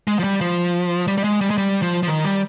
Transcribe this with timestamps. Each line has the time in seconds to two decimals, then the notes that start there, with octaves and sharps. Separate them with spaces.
0.08 G#3
0.19 F3
0.24 G3
0.41 F3
1.08 G3
1.18 G3
1.24 G#3
1.41 G3
1.50 G#3
1.58 G3
1.82 F3
2.03 F3
2.08 D#3
2.24 G3